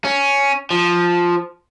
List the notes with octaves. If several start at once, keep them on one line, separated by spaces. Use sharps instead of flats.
C#4
F3